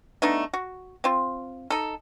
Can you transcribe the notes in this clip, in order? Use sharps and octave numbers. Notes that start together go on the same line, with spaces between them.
A3 B3 D4 D#4
F#4
C4 F4
D#4 A4